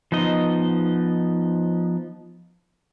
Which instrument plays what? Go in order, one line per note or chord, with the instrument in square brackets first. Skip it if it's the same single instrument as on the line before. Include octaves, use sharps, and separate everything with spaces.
[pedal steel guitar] F3 B3 D#4 D#5